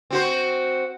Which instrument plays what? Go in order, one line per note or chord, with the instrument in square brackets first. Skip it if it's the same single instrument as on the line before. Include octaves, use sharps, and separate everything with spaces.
[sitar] C4 F#4 C5